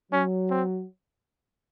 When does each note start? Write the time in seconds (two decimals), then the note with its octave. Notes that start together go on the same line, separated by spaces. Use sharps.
0.12 F#3 C#4
0.50 C4